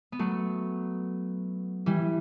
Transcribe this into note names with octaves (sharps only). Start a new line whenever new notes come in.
B3
F#3 A3
E3 G3